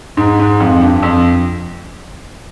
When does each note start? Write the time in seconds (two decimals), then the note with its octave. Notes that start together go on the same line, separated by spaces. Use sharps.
0.17 G#2
0.39 G#2
0.60 F2
0.81 G2
1.03 F2